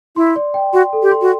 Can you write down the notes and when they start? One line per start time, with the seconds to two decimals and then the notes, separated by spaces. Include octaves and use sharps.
0.16 E4 C6
0.36 D5
0.54 G5
0.73 F#4 C6
0.93 A4
1.02 G4
1.12 C6
1.22 F#4